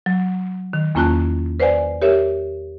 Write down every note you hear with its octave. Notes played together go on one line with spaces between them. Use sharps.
F#3
D#3
E2 A#3 C#4 F4 A5 F#6
B4 C5 D5 F#5 G#5
G4 A#4 C#5 E5